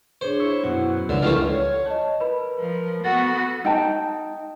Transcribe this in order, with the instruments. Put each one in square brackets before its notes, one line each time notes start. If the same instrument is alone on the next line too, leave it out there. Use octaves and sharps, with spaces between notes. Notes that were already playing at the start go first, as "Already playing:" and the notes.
[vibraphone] D4 G#4 C#5 [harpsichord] C5
[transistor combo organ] E4 C#6
[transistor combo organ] F#2 B2 [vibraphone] E4 F#4 F#5
[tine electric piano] C#2 [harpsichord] D3 [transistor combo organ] F3 E4 [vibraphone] C#4 D4 A#4
[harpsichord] E3 G3 A3 [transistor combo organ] F3 F4 F6
[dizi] C#5
[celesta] C#5 D#5 [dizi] A5
[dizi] A#4 [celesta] B4 B5
[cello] F3 [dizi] A#4
[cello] B3 F#4 [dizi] A4 [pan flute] F#5 [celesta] A6
[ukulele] D#4 G5 A5